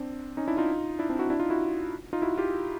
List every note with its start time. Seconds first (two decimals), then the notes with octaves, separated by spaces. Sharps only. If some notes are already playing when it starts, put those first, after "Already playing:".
Already playing: C4 D4
0.37 C#4 D#4
0.48 D4 E4
0.57 D#4 F4
0.99 D4 E4
1.09 C4 D4
1.19 E4 F#4
1.30 D4 E4
1.40 D#4 F4
1.50 E4 F#4
2.13 D#4 F4
2.22 E4 F#4
2.38 F4 G4